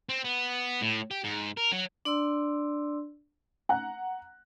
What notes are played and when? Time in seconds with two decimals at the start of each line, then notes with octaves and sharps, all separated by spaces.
0.09 C4
0.24 B3
0.82 A2
1.11 G4
1.24 G#2
1.57 A#4
1.72 F#3
2.05 D4 D5 C6 E6
3.69 F#5 A#5 F#6